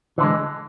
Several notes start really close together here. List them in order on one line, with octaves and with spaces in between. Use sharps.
E3 D3 G#3